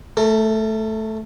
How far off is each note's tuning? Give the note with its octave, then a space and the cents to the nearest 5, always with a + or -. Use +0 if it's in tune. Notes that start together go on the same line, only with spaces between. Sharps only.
A3 -5 A#4 -40